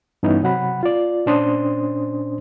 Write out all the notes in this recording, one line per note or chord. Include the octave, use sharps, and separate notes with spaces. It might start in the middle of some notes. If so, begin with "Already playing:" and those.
G2 E3 B3 C#4 D#4 E4
C3 F#3 F#5 B5
F4 D5
A#2 C#4 D4 C5 C6 D#6